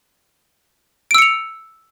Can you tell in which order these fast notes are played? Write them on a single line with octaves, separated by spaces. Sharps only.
D7 E6 C#7 F7